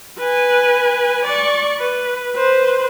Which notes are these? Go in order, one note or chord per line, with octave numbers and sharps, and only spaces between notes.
B4 G#5
D5 C#6
B4
B4 C5